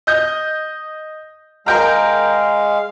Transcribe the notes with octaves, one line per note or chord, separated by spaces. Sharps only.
D#5 G6
G#3 A#4 F5 G5 A#5